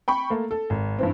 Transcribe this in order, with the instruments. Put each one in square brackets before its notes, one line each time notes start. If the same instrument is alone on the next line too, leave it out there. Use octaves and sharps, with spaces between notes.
[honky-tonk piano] G5 B5 C#6
A3 A#3
A4
G#1
G2 E3 C4